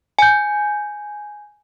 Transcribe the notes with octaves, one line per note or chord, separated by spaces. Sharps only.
G#5 G6